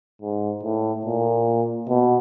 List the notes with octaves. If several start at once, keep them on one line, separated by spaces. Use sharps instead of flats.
G#2
A2
A#2
B2